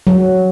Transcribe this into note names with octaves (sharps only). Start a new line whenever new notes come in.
F#3